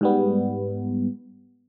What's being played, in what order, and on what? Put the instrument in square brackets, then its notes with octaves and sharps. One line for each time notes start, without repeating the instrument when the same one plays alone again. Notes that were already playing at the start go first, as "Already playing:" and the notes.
[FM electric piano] G#2 G3 B3